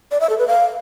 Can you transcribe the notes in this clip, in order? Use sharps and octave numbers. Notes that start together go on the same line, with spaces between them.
D5
E5
A4
B4
F5